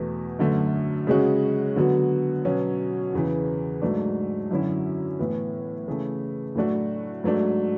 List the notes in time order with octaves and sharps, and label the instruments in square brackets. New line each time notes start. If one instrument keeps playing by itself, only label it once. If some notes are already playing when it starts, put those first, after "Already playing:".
Already playing: [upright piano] E2 B2 A3
F#2 D3 A3
C#3 G#3 C#4 F#4
D3 F#3 B3 F#4
B2 F#3 C#4
E2 C#3 E3
G#2 F#3 A3 D4
F#2 D3 F#3 C#4 E4
A2 E3 B3
C#3 E3 A3
A2 F#3 A3 D4 F#4
G#2 F#3 A3 D4